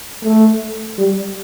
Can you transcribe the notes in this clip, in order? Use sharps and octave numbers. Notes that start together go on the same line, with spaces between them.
A3
G3